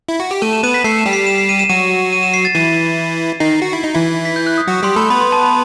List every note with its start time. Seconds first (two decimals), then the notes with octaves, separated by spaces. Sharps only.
0.08 E4
0.20 F#4
0.31 G4
0.42 A3 A4 D#7
0.53 E7
0.63 B3 B4 D#7
0.74 B6
0.84 A3 A4 C7
0.98 E7
1.06 G3 G4
1.13 C7
1.27 E7
1.38 C7
1.49 D#7
1.59 E7
1.69 F#3 F#4 D#7
2.13 D#7
2.23 E7
2.34 C7
2.45 A6
2.55 E3 E4 D#7
3.40 D#3 D#4 C7
3.62 F#4
3.73 E4
3.84 D#4
3.95 E3 E4
4.25 B6
4.36 G6
4.47 F#6
4.58 D#6
4.67 F#3 F#4
4.83 G3 G4 C6
4.96 A3 A4 B5
5.10 B3 B4 B5
5.21 C6
5.32 A5
5.43 B5